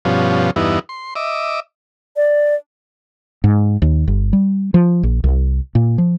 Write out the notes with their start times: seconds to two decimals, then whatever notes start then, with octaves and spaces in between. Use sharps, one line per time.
0.05 G2 B2 F3 C#4
0.56 E2 G2 B3 D#4 E4
0.89 C6
1.16 D#5 E5 D6
2.16 D5
3.44 G#2
3.82 D#2
4.08 G1
4.33 G3
4.74 F3
5.03 A#1
5.24 C2
5.75 A#2
5.98 F3